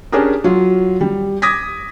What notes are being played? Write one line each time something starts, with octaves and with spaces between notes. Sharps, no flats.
C#4 D4 G4 G#4 A#4
F#3 F4
G3
D6 D#6 G#6 A#6 B6